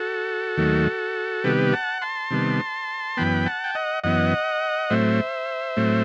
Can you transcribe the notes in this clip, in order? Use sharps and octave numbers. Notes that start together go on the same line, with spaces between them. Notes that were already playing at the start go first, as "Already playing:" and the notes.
Already playing: F#4 A4
D#2 D#3 F#3 A3
C3 D#3 G3 B3 G4 B4
F#5 A5
A5 C6
C3 D#3 G3 B3
F#2 E3 B3 G5 B5
F#5 A5
G5
D#5 F#5
F#2 E3 B3 D#5 F#5
A2 F#3 A3 C4 C5 E5
A2 F#3 A3 C4